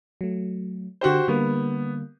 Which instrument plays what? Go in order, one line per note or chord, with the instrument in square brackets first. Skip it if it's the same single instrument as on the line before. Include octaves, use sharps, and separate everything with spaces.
[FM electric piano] F#3 A3
[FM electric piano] D3 G6 [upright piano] F#4 G4 C5
[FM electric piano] D3 G3 A#3 [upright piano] B3